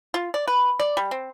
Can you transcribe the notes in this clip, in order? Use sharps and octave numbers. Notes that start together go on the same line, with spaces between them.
F4
D5
B4
D5
G3
C4